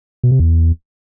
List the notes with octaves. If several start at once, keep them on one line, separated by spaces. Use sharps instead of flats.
B2
C3
E2